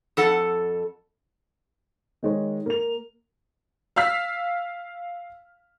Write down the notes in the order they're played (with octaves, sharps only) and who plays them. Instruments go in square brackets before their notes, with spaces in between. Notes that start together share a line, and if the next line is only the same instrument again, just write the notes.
[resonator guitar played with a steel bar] F2 A4 F#5
[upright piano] D#3 G#3 C#5
A#3 F7
[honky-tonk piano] F5 E6 F6 B6